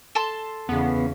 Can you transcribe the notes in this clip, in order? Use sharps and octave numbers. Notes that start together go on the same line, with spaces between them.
A4 A5 C6
E2 C#3 B3